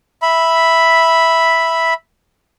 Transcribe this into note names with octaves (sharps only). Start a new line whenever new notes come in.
E5 B5